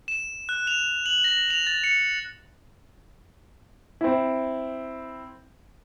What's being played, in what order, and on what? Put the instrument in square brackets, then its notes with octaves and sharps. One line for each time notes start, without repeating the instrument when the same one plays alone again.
[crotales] E7
F#6
F7
F#7
A#6
F7
A6
C#7
[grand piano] C4 E4